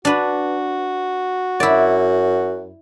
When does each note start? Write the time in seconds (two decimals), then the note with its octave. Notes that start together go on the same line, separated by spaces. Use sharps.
0.05 D4 F#4 B4
1.60 F#2 E4 D5